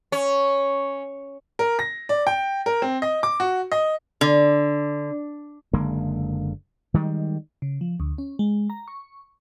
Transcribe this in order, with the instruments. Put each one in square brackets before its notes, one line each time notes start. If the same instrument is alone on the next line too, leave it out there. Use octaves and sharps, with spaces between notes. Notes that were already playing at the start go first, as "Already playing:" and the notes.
[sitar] C#4
[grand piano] A#4
A#6
D5
G5
A#4
C4
D#5
D6
F#4
D#5
[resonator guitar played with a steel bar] D3
[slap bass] F#1 D3 G#3 A#3
D#3 G3 G#3
[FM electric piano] C#3
F3
D2
C#4
G#3
A#5
C#6